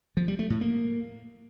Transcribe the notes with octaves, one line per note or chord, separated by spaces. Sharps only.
F3
G3
A3
A2
A#3